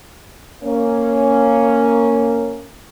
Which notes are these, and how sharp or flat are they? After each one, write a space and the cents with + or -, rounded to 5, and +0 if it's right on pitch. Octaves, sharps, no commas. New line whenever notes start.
A#3 -10 C#4 +0